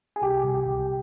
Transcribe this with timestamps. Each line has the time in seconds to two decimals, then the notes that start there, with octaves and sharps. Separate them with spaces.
0.16 G#4
0.22 C2 G4
0.43 C2
0.54 G4
0.65 C2